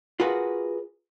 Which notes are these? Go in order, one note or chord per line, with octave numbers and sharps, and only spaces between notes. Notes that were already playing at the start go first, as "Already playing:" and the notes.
F4 F#4 G#4 A#4 B4 F#5